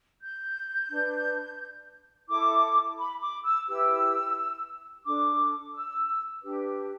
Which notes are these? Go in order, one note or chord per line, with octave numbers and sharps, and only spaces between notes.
G6
D4 B4
E4 A4 D6
B5
D6
E6
E4 G4 B4 E6
D4 A4 D6
E6
D4 G4 B4